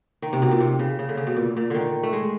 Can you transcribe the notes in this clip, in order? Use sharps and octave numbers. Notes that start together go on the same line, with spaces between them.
D#3
C3
B2
A#2
C3
C#3
C#3
D3
C#3
B2
A#2
A#2
D3 D#3
A3
G#3